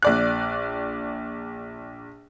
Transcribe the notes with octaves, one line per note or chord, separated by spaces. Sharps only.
A#1 D5 F#6